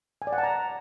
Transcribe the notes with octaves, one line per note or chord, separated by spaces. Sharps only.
G#5
D5
F#5
A5
A#5